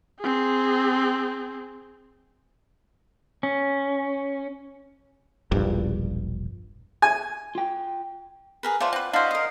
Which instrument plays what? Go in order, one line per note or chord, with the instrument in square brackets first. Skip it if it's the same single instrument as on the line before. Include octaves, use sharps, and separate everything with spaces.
[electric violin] C4 G#4
[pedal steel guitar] C#4
[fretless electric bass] E1 A#1 G2
[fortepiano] G#5
[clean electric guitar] F4 G5
[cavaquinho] G#4 A#4 B4
[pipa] A3 C5 [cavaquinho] F4 D5 F#5
[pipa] C4 B4
[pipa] D4 C5 [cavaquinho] E4 F#4 [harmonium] D#5 F5
[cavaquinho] A#4 D#6